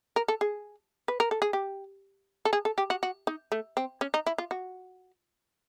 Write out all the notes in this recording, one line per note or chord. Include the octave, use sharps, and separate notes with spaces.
A#4
A4
G#4
B4
A#4
A4
G#4
G4
A4
G#4
A4
G4
F#4
F#4
D#4
A3
C4
C#4
D#4
E4
F4
F#4